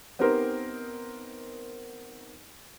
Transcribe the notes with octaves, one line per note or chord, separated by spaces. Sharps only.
B3 C4 D#4 G4 A#4 C5